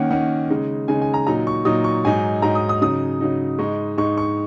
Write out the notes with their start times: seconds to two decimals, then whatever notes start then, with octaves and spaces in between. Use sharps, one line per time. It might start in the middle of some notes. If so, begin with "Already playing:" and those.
Already playing: D#3 A#3 C#4 F#5
0.11 D#3 A#3 C#4 F#5
0.50 C#3 G#3 D#4
0.88 C#3 G#3 D#4 G#5
1.02 G#5
1.14 A#5
1.27 A#2 F#3 D#4 A#5
1.47 C#6
1.65 A#2 F#3 D#4 D#6
1.84 C#6
2.05 G#2 F#3 D#4 G#5
2.42 G#2 F#3 D#4 A#5
2.55 D#6
2.69 D#6
2.82 C#3 F#3 D#4 D#6
3.21 C#3 F#3 D#4
3.58 G#2 G#3 D#4 C#6
3.97 G#2 G#3 D#4 C#6
4.18 C#6